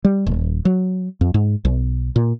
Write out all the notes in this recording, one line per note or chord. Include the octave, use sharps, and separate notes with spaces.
G3
D#1
F#3
F2
G#2
B1
A#2